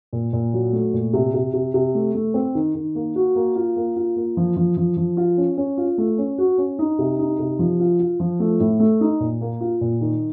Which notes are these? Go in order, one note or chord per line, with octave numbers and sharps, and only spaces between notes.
A#2
A#2
F#3
A3
A#2
C3
C3
C3
C3
A3
A3
C4
D#3
D#3
A#3
F#4
A#3
F4
A#3
F4
A#3
F3
F3
F3
F3
F4
C#4
C#4
F4
A3
C#4
F#4
C#4
D#4
C3
D#4
C3
F3
F4
F4
F3
A3
A2
A3
D#4
A#2
A#3
F4
A#2
D#3